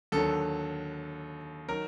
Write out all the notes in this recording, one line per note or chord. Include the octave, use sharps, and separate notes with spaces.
D#2 D3 F#3 A4
D#3 F#3 A#4